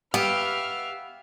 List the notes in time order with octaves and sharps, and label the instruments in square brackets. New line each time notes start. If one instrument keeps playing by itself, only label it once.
[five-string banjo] B3 B4 [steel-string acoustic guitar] G4 [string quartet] E5 F5 F6